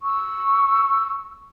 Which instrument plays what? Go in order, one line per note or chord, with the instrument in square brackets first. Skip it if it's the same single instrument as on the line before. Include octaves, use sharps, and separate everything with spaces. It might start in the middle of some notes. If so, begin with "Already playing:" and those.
[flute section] C#6 E6